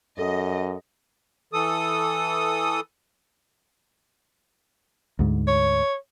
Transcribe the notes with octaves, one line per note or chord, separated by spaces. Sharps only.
F#2 A4 D#5
E3 A4 D#6
D2 G#2
C#5